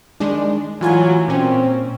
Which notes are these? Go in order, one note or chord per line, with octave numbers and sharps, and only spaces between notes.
D#3 G#3 D4
A2 E3 F#3 F4 G#5
A#2 C4 C#4